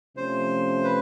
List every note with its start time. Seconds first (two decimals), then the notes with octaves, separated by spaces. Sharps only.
0.16 C3 F3 A3 C#4 C5
0.84 B4